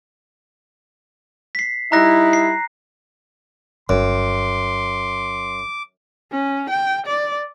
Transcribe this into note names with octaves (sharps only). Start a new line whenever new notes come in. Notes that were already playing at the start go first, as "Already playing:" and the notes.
B6 C7
G3 D#4 E4 A#5 F#6 A#6
C7
G1 F#2 C6 D6
C#4
G5
D5